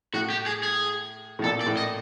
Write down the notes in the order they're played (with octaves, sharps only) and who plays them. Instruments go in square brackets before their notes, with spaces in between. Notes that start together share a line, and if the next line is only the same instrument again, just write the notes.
[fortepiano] A2 [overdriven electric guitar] F#4
[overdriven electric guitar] G4
G#4
G#4
[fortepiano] A2
[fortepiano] A#2 [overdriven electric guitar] A4
[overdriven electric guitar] D5
[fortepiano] A2
[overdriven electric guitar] D#5